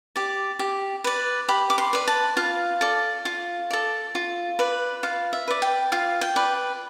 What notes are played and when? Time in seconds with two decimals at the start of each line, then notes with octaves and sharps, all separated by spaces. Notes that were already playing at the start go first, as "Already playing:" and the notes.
0.16 G4 D5
0.59 G4
1.04 B4 D5
1.48 G4 B5
1.70 D6
1.78 C6
1.93 B4 D5
2.07 A5
2.37 F4 F5
2.81 A4 D5
3.25 F4
3.71 A4 D5
4.15 F4
4.59 B4 D5
5.03 F4 F5
5.33 E5
5.48 B4 D5
5.62 G5
5.92 F4 F5
6.21 G5
6.36 B4 D5